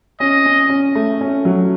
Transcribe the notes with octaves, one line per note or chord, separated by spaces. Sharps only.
C#4 D#5
C#4
C#4
A3
C#4
F#3